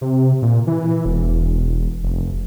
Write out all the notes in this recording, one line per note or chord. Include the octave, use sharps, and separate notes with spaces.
C3
A#2
E3
E1
F1